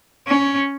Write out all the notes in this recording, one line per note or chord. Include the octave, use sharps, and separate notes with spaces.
C#4